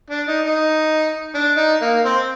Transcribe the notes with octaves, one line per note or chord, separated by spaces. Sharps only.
D4
D#4
D#4
D4
D#4
A#3
C4